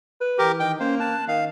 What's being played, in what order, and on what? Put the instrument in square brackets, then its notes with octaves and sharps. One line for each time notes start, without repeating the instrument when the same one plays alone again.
[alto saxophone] B4
[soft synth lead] E3 [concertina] G4 A#4
[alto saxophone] D#3 [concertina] G5
[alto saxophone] A#3 [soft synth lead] C#4 [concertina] C5
[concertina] A5 [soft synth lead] F#6
[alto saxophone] D#3 [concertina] F5